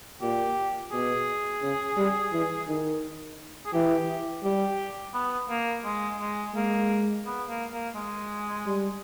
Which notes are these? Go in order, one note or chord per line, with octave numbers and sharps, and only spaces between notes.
A#2 G4
B2 G#4
C#3
G3
E3
D#3
G#4
E3 G4
G3 G4
B3
A#3
G#3
G#3
G#3 A#3
B3
A#3
A#3
G#3
G3